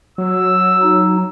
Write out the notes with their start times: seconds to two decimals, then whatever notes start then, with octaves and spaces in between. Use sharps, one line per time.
0.18 F#3 E6
0.82 D#4